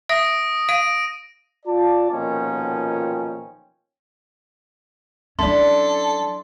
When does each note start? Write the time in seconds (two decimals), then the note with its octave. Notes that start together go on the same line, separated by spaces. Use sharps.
0.09 E5 D#6 A#6 D7
0.69 F5 D7 D#7
1.66 F4 D5 A5
2.10 B1 A#2 D#3 F3 C#4 G5
5.39 F#3 C#4 D4 E4 A4 C6